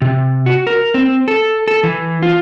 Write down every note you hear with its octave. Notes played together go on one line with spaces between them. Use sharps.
C3
F#4
A#4
C4
A4
A4
E3
F4